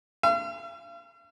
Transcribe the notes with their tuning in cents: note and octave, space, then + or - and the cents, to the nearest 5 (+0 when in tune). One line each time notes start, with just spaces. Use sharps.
F5 -45